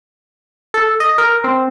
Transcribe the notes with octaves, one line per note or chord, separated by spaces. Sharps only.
A4
D#5
A#4
C4